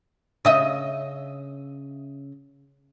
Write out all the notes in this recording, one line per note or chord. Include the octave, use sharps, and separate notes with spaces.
C#3 D#5 E5